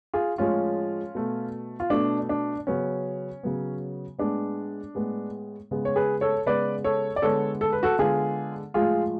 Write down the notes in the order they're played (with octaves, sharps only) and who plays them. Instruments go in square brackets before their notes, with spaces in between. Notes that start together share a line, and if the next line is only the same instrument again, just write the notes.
[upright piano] F4 G#4
A2 F3 G#3 C#4 F4
B2 A3
F4
B2 A3 D4
D4
C#3 F#3 B3 C#4
C#3 F#3 B3
A2 G#3 B3 D4
A2 G#3 B3
C#3 G#3 B3
C#5
G#4 B4
A4 C#5
C#3 G#3 B3 B4 D5
A4 C#5
D5
D3 G#3 B3 A4 C#5
A4
B4
F#4 A4
D3 G#3 B3 F4 G#4
A2 F3 G#3 F4 G#4